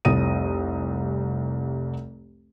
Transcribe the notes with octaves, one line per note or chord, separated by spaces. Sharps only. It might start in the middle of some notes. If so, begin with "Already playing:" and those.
F1 C2 D#6 A#6 D#7